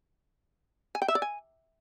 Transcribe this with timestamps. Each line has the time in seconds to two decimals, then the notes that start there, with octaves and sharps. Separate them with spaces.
0.95 G#5
1.02 G5
1.08 E5
1.15 D5
1.22 G#5